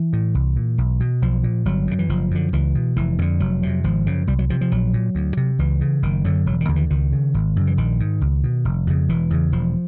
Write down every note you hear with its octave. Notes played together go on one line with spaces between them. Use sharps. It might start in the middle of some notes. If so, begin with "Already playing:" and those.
Already playing: E3
A2
C2
A#2
B1
B2
B1 F3
A#2
G1 F#3
F#2 C#3
E3
F#1 F3
F#2 D3
C#2 E3
B2
F1 E3
F2 D3 D#3
F1 F#3
F2 C3
G#1 F3
F#2 C#3
C2 G3
F#3
C3 F3
F3
A#1 F#3
A#2
D2
C3
C#2 E3
C#3
F#1 D#3
F#2 D3 F#3
E1 F#3
D#3
D#2 D3
E3
C#2 D#3
C#3
G#1
F#2 C#3
E3
A#1 D#3
G#2
C#2
B2
F1
F2 C#3
E1 E3
E2 C#3
E1 F3